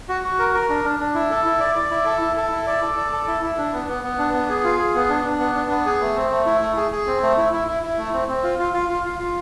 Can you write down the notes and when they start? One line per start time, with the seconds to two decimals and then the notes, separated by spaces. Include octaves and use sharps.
0.09 F#4
0.24 F#4
0.39 A#4
0.54 A#4
0.69 D4
0.85 D4
1.00 D4
1.15 E4
1.31 A4
1.45 E4
1.60 D5
1.76 D5
1.91 E4
2.06 A4
2.21 E4
2.37 A4
2.52 E4
2.67 D5
2.82 A4
2.97 D5
3.12 A4
3.28 E4
3.43 E4
3.58 D4
3.73 B3
3.88 B3
4.03 B3
4.18 D4
4.34 B3
4.49 G#4
4.64 F4
4.79 G#4
4.95 B3
5.09 D4
5.25 D4
5.40 B3
5.55 D4
5.71 B3
5.86 G#4
6.01 A3
6.16 C4
6.31 A3
6.46 E4
6.62 A3
6.77 G#4
6.92 G#4
7.07 C4
7.23 A3
7.37 E4
7.53 E4
7.68 E4
7.83 E4
7.98 A3
8.13 C4
8.28 C4
8.43 F4
8.59 F4
8.74 F4
8.89 F4
9.05 F4
9.19 F4